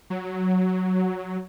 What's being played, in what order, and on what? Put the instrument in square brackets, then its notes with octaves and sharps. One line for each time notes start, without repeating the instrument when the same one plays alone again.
[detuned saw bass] F#3